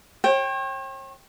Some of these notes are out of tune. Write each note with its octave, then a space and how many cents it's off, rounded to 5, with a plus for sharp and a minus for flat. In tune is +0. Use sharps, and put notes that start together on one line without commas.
C#5 -45 G5 +0